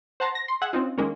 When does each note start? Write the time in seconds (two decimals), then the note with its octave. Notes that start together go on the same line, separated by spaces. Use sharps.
0.20 C5 F#5 A5 A#5 C6
0.35 A#6
0.48 C6
0.61 G#4 E5 F#5
0.73 C4 C#4 D#4 F4
0.98 D#3 G#3 A#3 C#4